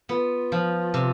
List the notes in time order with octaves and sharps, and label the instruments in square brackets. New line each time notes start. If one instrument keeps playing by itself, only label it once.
[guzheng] B3 [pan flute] F4
[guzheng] F3
C3